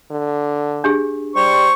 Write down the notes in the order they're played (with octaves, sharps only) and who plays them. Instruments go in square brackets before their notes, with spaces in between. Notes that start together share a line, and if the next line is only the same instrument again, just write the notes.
[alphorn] D3
[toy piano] D4 G4 G#4
[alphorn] G3 [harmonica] C5 C#6